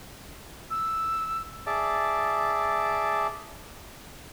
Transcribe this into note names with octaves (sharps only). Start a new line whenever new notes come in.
E6
G#4 D5 E5 A5 D6